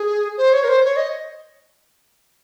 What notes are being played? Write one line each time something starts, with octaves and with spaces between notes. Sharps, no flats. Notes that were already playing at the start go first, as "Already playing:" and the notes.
Already playing: G#4
C5
C#5
A#4
C5
C#5
D#5